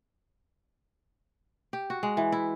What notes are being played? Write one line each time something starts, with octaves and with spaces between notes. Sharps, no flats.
G4
F#4
G#3
E3
E4